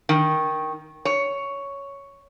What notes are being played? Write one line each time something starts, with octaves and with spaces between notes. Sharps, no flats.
D#3
C#5